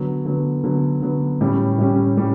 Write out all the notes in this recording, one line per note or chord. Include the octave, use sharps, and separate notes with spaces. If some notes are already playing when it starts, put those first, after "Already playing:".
Already playing: D3 F#3 B3
D3 F#3 B3
D3 F#3 B3
D3 F#3 B3
A2 G3 C#4 G4
A2 G3 C#4 G4
A2 G3 C#4 G4